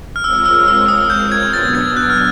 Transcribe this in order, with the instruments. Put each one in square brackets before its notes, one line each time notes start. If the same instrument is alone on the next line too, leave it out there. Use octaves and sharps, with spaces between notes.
[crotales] F6
[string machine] G#3 C4 F4 A#4 C#5 [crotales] E6
[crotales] E6
E6
D#6
G6
G#6
[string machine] B2 F#3 B3 D4 [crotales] A6
[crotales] G#6
F#6
F6